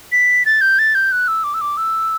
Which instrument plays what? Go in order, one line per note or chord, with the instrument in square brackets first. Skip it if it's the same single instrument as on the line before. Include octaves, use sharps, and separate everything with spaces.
[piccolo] B6
A6
G6
A6
G6
F#6
E6
D6
E6
D6
E6